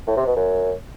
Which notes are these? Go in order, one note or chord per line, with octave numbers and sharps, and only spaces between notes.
A2
C3
B2
F#2